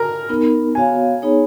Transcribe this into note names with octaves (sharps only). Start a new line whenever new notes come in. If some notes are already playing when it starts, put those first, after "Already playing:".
Already playing: A#4 A#5
B3 D#4 A#4
B3 F#4 C#5 F5 G#5
B3 D#4 G#4 C#5